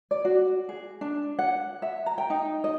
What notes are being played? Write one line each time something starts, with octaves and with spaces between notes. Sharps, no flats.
D5
F#4
G#4
D4
F#5
E5
A#5
G5
D#4
D#5